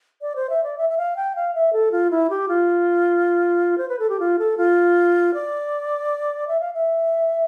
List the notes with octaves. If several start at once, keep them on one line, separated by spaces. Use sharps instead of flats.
D5
C5
E5
D5
E5
E5
F5
G5
F5
E5
A4
F4
E4
G4
F4
C5
B4
A4
G4
F4
A4
F4
D5
E5
F5
E5